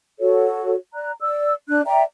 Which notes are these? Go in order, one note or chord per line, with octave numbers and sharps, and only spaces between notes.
F#4 A4 C#5
D5 A#5 F#6
D5 E6
D4 F#6
D5 E5 G5 A#5